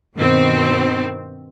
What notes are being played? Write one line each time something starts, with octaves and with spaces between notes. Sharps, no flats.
G2 B2 D#3 C4